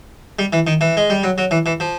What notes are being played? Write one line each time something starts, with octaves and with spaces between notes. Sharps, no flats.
G3
E3
D#3
E3
G#3
G3
F#3
F#3
E3
E3
F3